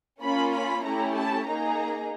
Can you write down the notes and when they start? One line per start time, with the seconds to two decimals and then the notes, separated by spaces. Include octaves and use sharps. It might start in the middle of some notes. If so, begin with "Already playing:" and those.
0.22 A#3 C#4 F4 B5
0.53 B5
0.84 A3 C#4 E4 G4 A#5
1.15 A5
1.47 A#3 D#4 G#4 A#5